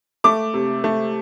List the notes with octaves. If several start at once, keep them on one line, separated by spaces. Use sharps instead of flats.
A3 D6
C3
A3